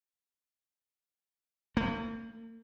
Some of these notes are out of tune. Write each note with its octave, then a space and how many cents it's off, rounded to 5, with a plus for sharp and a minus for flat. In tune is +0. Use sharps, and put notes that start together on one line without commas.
A#3 -45